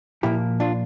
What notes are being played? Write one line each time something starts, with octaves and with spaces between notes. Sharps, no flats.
A#2 F3 A#3 E4 G4
D4 F4